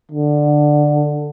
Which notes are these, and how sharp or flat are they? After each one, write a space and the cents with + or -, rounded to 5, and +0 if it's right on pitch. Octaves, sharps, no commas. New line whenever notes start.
D3 +10